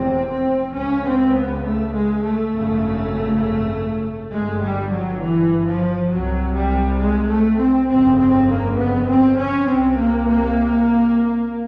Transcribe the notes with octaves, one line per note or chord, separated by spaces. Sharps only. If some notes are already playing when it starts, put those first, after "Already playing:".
Already playing: F1 E2 C3 C4
C4
C#2 C#3 C#4
C4
B3
A3
G#3
A3
G#1 F#2 C#3
G1 G2 G#3
G3
F#3
E3
F3
C2 C3 F#3
G3
G#3
A3
C4
G1 F2 C#3 C4
C4
A#3
B3
C4
C#4
C2 C3 C4
A#3
A#3